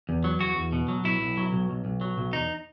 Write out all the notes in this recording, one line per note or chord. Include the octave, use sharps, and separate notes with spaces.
E2
F#3
E2 F#4
E2
B2
F#3
B1 E4
B1
F#3
B1
B1
B1
F#3
B1
E2 D#4